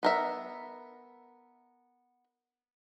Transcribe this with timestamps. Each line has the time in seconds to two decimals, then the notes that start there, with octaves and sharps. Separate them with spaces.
0.03 B3 A#4 E5